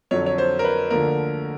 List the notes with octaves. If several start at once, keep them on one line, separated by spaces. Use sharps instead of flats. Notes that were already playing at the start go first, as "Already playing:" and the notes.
F2 D3 F#3 C#5
C#5
C5
A#4
B4
D2 D3 F3 A#3 A#4